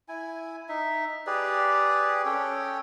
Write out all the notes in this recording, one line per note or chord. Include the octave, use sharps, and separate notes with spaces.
E4 G#5
D#4 E5
G4 G#4 B4 D5
C#4 A4 C#5 G5